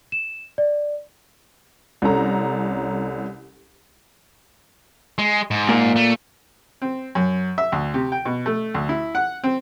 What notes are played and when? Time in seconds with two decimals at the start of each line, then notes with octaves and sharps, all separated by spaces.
0.12 E7
0.58 D5
2.02 C2 C#4 A4 A#5
5.18 G#3
5.51 G#2
5.69 A#2
5.96 A3
6.82 C4
7.15 F#2
7.58 E5
7.72 D2
7.94 C3
8.12 G5
8.26 B2
8.46 A3
8.74 D2
8.89 E4
9.15 F#5
9.44 C4